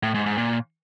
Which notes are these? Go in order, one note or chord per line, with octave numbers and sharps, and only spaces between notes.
A2
G#2
G#2
A#2